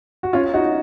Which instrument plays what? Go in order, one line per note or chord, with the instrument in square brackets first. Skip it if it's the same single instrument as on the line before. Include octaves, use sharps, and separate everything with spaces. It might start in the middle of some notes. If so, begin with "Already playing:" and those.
[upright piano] F#4
C#4 F4
D#4 F#4